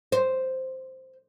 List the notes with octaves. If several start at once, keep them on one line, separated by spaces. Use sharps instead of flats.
C5